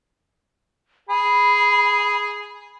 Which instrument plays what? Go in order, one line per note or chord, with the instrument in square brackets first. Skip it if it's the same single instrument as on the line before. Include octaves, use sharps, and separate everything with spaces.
[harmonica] G#4 [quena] B5